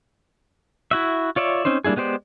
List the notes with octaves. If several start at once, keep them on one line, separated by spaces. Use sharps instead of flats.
E4 F#4 E5
F4 C#5 D5 E5
C4 C#4 D#4 C5
G3 A#3 D4 E4 G#4
G#3 B3 G4 C5 D5